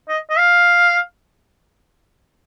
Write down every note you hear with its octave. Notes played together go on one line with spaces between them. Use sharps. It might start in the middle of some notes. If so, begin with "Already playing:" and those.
D#5
D#5
F5